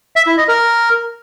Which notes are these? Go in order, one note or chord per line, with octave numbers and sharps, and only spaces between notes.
E5
E4
D#5
A#4